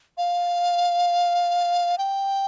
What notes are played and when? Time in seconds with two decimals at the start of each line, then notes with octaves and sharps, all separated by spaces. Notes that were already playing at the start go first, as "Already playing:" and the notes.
0.18 F5
1.98 G5